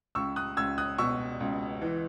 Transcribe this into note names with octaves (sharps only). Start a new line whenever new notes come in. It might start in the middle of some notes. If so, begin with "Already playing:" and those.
C#2 C#6 E6
D#6 F#6
C#2 E6 G#6
D#6 F#6
B2 C#6 E6
C#2
E3